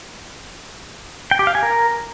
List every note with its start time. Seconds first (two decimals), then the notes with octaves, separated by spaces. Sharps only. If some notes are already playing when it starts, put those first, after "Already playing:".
1.31 G5
1.39 G4
1.47 F5
1.55 G#5
1.63 A#4